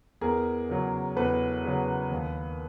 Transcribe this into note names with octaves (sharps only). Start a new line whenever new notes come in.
E2 G#4 A#4
C#3 F#3
E2 A4 B4
C#3 F#3
D#2